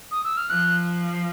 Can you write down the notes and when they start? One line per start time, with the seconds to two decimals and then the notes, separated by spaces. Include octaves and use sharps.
0.12 D#6
0.24 E6
0.37 F6
0.50 F3 F#6